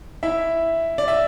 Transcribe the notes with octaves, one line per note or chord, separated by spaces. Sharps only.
E4 E5
D5
E5